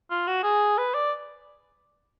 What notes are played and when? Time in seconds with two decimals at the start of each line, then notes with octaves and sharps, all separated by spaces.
0.10 F4
0.27 F#4
0.43 G#4
0.78 B4
0.94 D5